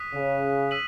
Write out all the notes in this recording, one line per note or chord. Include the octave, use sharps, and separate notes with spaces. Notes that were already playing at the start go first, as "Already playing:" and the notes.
Already playing: D#6 F#6 B6 D#7
C#3
E6 B6 D#7 F#7